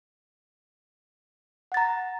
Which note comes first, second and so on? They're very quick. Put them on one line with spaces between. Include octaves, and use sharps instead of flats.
F#5 A6 A#5